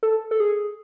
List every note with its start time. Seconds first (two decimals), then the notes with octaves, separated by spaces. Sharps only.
0.03 A4
0.31 A4
0.40 G#4